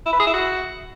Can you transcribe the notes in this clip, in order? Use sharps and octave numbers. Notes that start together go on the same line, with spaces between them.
E4
B4
G#4
E4
F#4